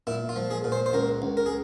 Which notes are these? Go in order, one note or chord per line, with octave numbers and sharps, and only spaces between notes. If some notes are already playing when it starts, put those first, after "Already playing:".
A#2 E4
F4
F3
G#4
A#2
C5
C5
C#2 A#4
C#2
A#4
G#4